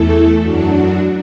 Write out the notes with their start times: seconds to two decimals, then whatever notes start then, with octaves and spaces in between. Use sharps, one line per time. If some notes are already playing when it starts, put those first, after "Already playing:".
Already playing: E2 E3 A3 E4 A4
0.41 F#2 F#3 D4 F#4